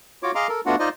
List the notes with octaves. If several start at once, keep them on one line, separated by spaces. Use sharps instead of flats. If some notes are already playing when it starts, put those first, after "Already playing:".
F4 F#4 C#5 D6
G#4 D#5 F5 A#5 C6 D6
A4 A#4
A3 B3 D4 F4 F#4 F#5
D#4 F4 C5 D5 D#5